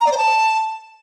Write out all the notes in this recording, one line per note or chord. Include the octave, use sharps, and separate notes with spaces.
A#5
D5
C5
A5